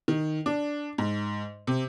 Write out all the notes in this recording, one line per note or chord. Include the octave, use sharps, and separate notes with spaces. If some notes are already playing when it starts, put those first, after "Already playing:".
D#3
D4
G#2
C3